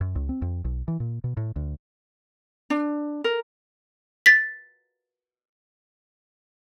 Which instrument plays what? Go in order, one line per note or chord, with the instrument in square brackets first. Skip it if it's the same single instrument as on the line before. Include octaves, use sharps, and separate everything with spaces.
[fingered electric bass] F#2
C#2
C4
F2
B1
E3
A#2
B2
A2
D2
[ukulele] D4
A#4
[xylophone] A6 B6